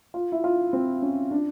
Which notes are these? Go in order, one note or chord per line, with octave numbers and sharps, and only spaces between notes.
F4
E4
F4
C4
C#4
D4